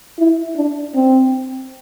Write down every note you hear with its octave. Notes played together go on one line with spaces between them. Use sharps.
E4
D4
C4